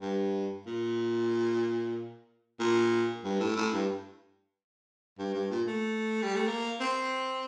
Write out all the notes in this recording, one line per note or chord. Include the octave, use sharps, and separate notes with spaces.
G2
A#2
A#2
G2
A2
A2
G2
G2
G2
A#2
A3
G3
A3
A#3
C4